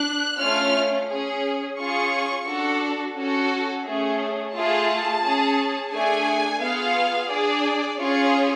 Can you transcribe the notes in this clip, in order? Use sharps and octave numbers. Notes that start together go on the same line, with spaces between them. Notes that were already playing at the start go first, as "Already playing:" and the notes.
Already playing: D4 F#6
A3 C#4 F4 F6
C#4 G#4
C#4 F4 G#4 C#6
D4 F#4 A4
C#4 F#4 A4
A3 C#4 G#4
A3 F4 G#4 A5
C#4 G#4
A3 D4 G#4 G#5
B3 F4 G#4 F5
D4 G#4 D5
C#4 F4 G#4 C#5